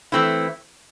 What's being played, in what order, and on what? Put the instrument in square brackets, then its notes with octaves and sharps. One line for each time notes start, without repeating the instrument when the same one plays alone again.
[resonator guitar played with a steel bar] E3 A3 C4 E4